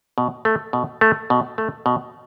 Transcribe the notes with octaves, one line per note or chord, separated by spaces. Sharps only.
B2
A3
B2
A3
B2
A3
B2